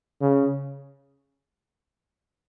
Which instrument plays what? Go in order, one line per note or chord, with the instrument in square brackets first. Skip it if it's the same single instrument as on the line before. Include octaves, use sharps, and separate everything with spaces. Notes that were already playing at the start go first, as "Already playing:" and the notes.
[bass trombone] C#3